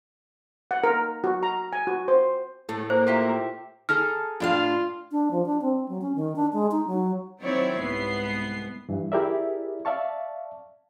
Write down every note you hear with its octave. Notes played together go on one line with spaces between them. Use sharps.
F#5
A#4
F#4
A#5
G#5
F#4
C5
A2 A3
A#3 C5
F4 G4 E5
G#4 A4 A#5 F6
A2 D4 F4 F5 G5
D4
F3
D4
C4
F#3
C#4
D#3
D4
G#3
D#4
F#3
D#3 F#3 C4 E4 C#5 D5
C2 G#2 B3 C7
G2 E3
E4 G4 G#4 A#4 D5 E5
D5 E5 F5 A5 C#6